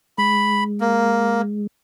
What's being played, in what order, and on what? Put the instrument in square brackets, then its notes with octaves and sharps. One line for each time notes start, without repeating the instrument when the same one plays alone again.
[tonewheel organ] G#3 [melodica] B5
[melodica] A#3